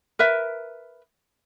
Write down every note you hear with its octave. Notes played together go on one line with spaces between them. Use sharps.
A#4 B4 E5